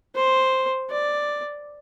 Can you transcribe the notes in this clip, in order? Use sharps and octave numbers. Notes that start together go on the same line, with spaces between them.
C5
D5